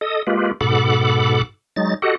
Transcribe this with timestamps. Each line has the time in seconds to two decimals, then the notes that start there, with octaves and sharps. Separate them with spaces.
0.01 A4 D#5 D#6
0.27 G#3 A#3 F4 G4 B4
0.61 G#2 B2 A4 F#5 B5 D6
1.76 F#3 G#3 D#4 A6
2.02 F#4 G4 A4 D#5 F#5